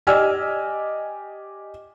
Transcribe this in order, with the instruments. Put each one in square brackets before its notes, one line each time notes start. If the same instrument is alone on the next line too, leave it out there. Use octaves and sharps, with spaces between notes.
[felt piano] G4 D5 D#5 G#5 E6 F6